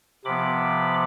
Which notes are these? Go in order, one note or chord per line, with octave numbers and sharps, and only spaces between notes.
C3 F3 B3 B5 D6